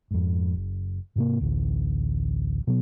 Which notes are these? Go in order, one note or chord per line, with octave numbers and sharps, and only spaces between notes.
F2 G#2
F#1
G#2 C3 A#3
A1 D2
B2 F#3 B3